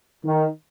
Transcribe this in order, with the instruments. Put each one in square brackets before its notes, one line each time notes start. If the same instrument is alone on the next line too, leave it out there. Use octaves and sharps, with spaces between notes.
[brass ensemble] D#3